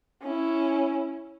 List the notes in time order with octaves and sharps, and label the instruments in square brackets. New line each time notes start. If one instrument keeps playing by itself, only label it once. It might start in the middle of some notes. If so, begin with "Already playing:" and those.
[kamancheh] C#4 E4